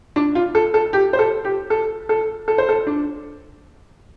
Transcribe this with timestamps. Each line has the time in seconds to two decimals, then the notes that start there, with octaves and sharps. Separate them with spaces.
0.16 D4
0.35 F4
0.55 A4
0.74 A4
0.93 G4
1.13 C5
1.19 A4
1.45 G4
1.70 A4
2.09 A4
2.48 A4
2.58 C5
2.69 A4
2.87 D4